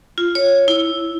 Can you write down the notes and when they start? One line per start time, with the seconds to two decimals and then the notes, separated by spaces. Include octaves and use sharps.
0.18 F4
0.35 C#5
0.68 E4